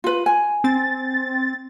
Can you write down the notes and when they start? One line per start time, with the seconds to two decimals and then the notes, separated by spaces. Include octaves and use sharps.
0.04 F4 B4
0.26 G#5
0.64 C4 A6